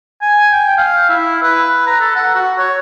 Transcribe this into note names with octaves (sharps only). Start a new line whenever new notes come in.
G#5
G5
F5
E4
B4
A#5
A4
F#5
F#4
C#5